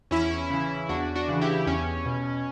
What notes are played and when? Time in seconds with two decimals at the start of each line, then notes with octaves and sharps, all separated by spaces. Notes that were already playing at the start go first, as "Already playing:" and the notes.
0.11 E2 C#4 E4
0.50 C#3 E3
0.89 E2 D4 F#4
1.15 D4 F#4
1.28 C#3 E3
1.41 E4 G4
1.67 E2 C#4
2.05 B2